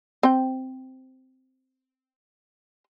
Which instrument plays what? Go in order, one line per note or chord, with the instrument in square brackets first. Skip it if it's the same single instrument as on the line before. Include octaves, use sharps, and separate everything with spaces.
[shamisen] C4 G5